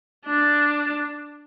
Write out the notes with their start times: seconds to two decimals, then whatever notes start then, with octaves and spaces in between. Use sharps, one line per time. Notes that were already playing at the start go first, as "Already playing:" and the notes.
0.26 D4